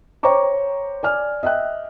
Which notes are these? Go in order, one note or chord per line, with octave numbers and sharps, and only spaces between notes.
C5 C#5 G5 A#5 C#6 D6
D5 G#5 F6
D#5 E5 G5 F#6